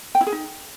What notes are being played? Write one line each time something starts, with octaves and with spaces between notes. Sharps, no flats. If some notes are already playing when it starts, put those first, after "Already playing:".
G5
E4
G#4
D#4